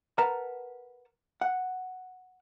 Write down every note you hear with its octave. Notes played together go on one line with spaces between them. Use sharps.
A#4 B4 F#5 A5 A#5
F#5